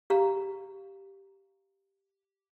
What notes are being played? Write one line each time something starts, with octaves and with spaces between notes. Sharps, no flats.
G4 F5 A#5